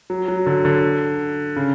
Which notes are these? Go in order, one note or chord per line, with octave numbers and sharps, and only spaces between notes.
F#3
F#3
D3
D3
C#3